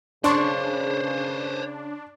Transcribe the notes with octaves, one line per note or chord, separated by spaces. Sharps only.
C#3 D4 C5 C#5 C6 C#6